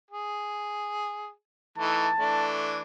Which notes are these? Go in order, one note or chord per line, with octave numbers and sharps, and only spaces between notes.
G#4
E3 A3 D#4 A5
E3 A3 D4